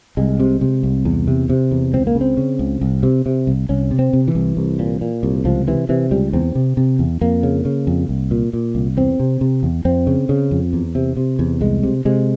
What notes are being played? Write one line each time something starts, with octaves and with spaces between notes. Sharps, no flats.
C2 G#3
C3
C3
C2
E2
C3
C3
E2
C#2 C4
A#3
C#3
C4
C#3
C#2
C2
C3
C3
C2
C2 C#4
C3
C4
C3
E3
C2
C2
A#2
A#2
C2
C#2 F3
C3 E3
C3 E3
C#2 G3
E2 C4
C3
C3
E2
F2 A#3
C#3
C#3
F2
C2
A#2
A#2
C2
E2 C4
C3
C3
E2
F2 C4
C#3
C#3
F2
E2
C3
C3
E2
C2 G#3
C3
C3 G#3